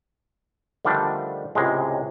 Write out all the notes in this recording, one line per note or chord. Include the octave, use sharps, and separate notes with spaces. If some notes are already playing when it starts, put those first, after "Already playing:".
D3 D#3 F3 G3 A3 D4
C#2 A2 C3 G#3